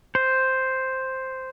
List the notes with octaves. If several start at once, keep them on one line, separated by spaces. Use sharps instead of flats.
C5